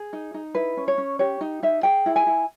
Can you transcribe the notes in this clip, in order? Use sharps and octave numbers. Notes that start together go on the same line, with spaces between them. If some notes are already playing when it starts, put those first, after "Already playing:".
Already playing: G#4
D#4
D#4
E4 B4
C#4
C#5
C#4
G4 C#5
D#4
D#4 E5
G#4 G5
E4
G#5
E4